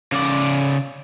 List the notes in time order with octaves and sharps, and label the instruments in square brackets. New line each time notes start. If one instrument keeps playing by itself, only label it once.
[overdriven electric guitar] C#3 D5